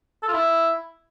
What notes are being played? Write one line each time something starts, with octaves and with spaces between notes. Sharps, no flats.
A4
F4
E4